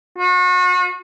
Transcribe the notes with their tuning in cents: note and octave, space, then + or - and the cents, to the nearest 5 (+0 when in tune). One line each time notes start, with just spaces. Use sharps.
F#4 -35